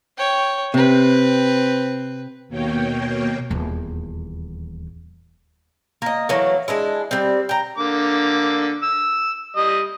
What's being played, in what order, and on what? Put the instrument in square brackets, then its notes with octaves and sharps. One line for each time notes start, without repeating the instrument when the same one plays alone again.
[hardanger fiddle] C#5 G5
[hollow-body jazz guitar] C3 [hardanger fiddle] C4 B4
[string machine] D#2 B2 A#3 C#5 G5
[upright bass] D#1 E2
[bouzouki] A#3 D#5
E3 F#3 A3 A#3
G#3 D4 E4
G3 C4
G5 A#5
[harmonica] D3 A#3 D6
E6
G3 D#5